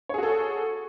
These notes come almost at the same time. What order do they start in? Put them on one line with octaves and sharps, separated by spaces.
C#5 G#4 F#4 A4